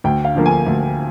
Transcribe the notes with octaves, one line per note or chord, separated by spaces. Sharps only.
D2 G5
F5
D3 F3 A#3
G#5
D2